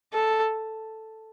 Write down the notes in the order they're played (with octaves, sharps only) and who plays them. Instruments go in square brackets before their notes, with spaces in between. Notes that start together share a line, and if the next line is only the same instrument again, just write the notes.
[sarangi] A4